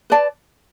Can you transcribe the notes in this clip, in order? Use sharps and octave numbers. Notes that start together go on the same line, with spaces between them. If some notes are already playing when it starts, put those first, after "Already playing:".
B4 D5 A5